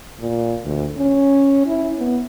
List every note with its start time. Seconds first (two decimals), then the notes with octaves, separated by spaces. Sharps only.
0.20 A#2
0.65 D2
0.97 C#4
1.67 E4
1.98 B3